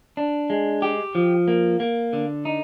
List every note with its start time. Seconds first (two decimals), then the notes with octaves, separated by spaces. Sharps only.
0.17 D4
0.50 G#3
0.82 G4
1.15 F3
1.48 A#3
1.80 A#3
2.13 D3
2.45 D#4